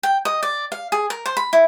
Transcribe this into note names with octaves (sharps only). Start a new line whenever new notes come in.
G5
D#5
D5
F5
G#4
A#4
C5
B5
E4